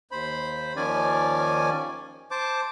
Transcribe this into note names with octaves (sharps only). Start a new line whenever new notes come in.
D#2 C5 B5
D#2 D#3 F3 C#4 D5 G#5
C5 A5 D6